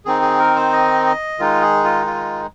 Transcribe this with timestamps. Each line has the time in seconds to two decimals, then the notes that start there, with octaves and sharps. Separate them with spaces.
0.05 D#3 C4 D#4 G#4
0.22 G#4
0.39 A#4
0.56 C5
0.73 D#5
1.06 D#5
1.39 D#3 G#3 D#4 F4
1.62 G#4
1.84 F4
2.06 F4